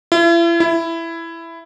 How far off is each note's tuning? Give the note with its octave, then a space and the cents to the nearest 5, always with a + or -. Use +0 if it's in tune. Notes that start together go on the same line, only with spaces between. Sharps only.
E4 +40
E4 +10